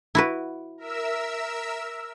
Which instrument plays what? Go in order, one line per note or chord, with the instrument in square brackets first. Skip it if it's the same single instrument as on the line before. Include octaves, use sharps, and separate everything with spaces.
[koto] E4 F#4 B4
[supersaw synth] A#4 E5 E6